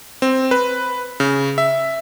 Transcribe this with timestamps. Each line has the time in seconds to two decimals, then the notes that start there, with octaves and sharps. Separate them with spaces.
0.22 C4
0.51 B4
1.20 C#3
1.58 E5